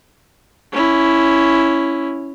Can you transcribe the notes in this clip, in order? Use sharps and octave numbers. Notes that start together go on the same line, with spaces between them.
C#4 E4